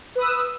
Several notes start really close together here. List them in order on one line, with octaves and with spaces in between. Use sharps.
B4 D#6 E6